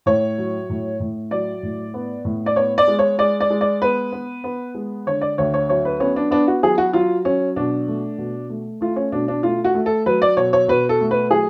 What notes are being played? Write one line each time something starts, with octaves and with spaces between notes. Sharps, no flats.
A2 C#5
F#3
A2
A2
F#3 D5
A2
B3
A2
D5
B3 C#5
D5
G#3
C#5
G#3 D5
D5
G#3
D5
B3 B4
B3
B3
G#3
D3 C#5
D5
D2 C#5
C#5
F#3 C#5
B4
B3 C#4
D4
B3 D4
F#4
F#3 G#4
F#4
F#3 F4
F#3 C#4
B2 D4
A3
B2
A3
A3 F4
C#4
B2 D4
D4
A3 F4
F#4
A3
A4
F#3 B4
D5
B2 C#5
C#5
B2 B4
A4
A3
B4
F#3 G#4